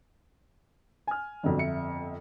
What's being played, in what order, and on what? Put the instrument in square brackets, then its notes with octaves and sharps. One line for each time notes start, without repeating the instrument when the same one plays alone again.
[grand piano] G#5 F6
[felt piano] G1 F2 [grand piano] F#3 D4
[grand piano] E5 C#7